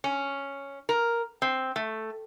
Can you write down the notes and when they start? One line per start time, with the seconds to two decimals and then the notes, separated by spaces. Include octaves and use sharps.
0.04 C#4
0.89 A#4
1.42 C4
1.76 A3